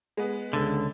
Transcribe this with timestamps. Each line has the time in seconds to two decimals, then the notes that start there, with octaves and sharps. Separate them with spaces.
0.17 G#3 B3
0.53 C#2 D3